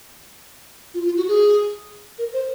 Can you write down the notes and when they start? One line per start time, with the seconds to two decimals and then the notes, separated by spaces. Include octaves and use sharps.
0.94 F4
1.05 F4
1.17 F#4
1.28 G#4
2.19 A#4
2.33 C5